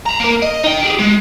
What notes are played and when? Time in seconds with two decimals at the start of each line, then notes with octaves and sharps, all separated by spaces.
0.06 A5 A#5
0.20 A#3 A#4
0.42 D#5
0.64 D#4 G5
0.83 G4 G#4
0.99 G#3